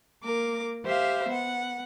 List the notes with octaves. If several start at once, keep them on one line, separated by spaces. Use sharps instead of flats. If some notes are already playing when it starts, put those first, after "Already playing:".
A#3 A#4 D6
G4 C5 E5 F5
B3 F#5